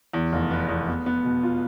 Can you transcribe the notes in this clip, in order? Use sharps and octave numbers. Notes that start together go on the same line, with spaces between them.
E2
F1
B3
E2
B3
B3
B2
F4